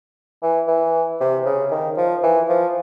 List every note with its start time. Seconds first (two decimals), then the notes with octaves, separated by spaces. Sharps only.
0.42 E3
0.68 E3
1.20 C3
1.45 C#3
1.71 D#3
1.97 F3
2.23 E3
2.49 F3